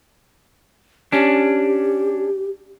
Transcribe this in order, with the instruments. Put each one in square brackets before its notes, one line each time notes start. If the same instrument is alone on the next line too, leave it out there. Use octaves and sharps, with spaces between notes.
[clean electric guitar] C#4 D4 [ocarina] G4